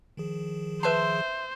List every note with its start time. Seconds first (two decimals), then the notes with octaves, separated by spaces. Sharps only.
0.17 D#3 F3 G#4
0.83 B4 C5 E5 A5 C6